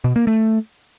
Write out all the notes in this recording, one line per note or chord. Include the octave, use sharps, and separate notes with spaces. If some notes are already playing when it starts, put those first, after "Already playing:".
B2
A#3
A3